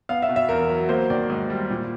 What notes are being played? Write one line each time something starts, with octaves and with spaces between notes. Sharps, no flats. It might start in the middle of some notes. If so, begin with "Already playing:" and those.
B3 F5
E5
B2
E5
E2 A#4
F#3
A#3 C5
D#3 D5
G#2
G3
A#2